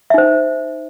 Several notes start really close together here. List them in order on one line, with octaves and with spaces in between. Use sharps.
E5 D#4 C5